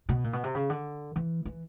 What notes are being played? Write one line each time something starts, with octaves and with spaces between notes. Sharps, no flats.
B2
A#2
B2
C3
C#3
D3
E3
E3